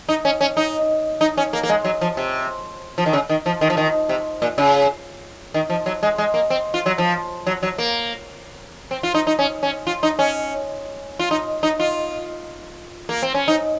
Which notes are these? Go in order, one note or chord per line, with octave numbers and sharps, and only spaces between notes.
D#4
C#4
C#4
D#4
D#4
C#4
A#3
A#3
G#3
F#3
F3
C3
F3
D#3
C#3
D#3
F3
D#3
F3
D#3
C3
A#2
C#3
D#3
F3
F#3
G#3
G#3
A#3
C4
F4
F#3
F3
F#3
F#3
A#3
C4
F4
D#4
D#4
C#4
C#4
F4
D#4
C#4
F4
D#4
D#4
F4
A#3
C4
C#4
D#4